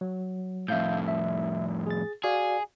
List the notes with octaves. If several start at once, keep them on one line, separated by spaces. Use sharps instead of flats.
F#3
F2 A2 E5 F5 G6
E5
G#4 A6
F#4 G#4 D5 F5